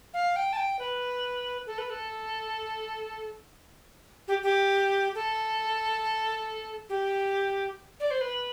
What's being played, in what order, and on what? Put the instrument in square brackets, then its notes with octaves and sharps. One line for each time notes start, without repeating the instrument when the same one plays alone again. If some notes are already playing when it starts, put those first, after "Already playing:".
[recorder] F5
G5
A5
G5
B4
A4
B4
A4
G4
G4
A4
G4
D5
C5
B4